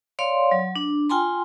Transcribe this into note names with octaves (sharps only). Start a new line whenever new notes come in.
C#5 D5 F5 C6
F#3
D4
F4 G5 G#5 A#5 C6